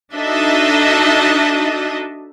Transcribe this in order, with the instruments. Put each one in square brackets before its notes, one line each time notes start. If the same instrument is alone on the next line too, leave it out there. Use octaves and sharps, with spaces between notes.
[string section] D4 D#4 F#4 A4 D#5 E5